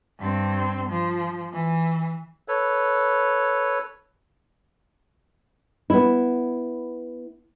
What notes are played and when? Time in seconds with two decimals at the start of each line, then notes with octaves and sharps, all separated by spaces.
0.19 G2 C4
0.90 F3
1.53 E3
2.48 A4 B4 C#5
5.90 B3 E4